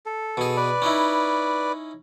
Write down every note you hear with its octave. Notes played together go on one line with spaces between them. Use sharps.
A4
B2 G#4
B4 D5
C#4 D#4 E4